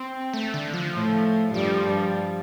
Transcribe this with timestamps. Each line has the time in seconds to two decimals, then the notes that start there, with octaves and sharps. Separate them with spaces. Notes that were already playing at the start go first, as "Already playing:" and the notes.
Already playing: C4
0.34 A3
0.54 D3
0.74 F3
0.94 A2 A3
1.54 G2 F3 G3
1.84 G2 G3